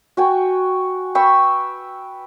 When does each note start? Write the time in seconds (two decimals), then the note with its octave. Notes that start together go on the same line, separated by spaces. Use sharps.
0.17 F#4 G5 G#5
1.15 B4 G5 C#6 E6